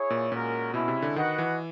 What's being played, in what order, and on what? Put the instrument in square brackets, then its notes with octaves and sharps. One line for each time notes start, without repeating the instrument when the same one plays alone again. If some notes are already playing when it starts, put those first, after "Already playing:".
Already playing: [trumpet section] E4 G#4 C#5
[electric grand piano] A#2
[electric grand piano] A#2 [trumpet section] G#3 C#4 F#4 A#4
[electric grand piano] B2 [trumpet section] G#3 C#4 E4
[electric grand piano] C3
D3
[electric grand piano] D#3 [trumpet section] F#4 B4 D#5 F#5
[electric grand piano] E3